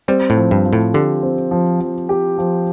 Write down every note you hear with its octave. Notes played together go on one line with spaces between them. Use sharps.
G3 C4
A2
F3
G2
F3
A2
D3 G4
C4
F3
F3
G4
F3